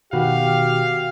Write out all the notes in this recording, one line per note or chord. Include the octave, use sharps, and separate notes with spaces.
B2 D#3 F#4 G4 B4 F5 F#5